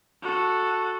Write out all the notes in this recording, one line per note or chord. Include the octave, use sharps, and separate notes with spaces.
F#4 A4